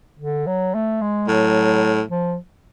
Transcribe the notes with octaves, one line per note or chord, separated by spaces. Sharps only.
D3
F#3
A3
G#3
A2 F#3
F3